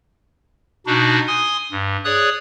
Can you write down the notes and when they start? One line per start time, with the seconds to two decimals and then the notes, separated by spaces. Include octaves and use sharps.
0.86 B2 D4 D#4 F#4
1.27 G#5 C6 D#6
1.71 G2
2.05 G#4 C#5 D5 D#6 F#6